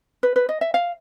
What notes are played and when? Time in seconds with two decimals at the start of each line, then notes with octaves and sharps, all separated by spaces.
0.23 B4
0.36 B4
0.49 D#5
0.61 E5
0.74 F5